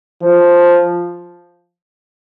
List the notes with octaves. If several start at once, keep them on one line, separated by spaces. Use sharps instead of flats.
F3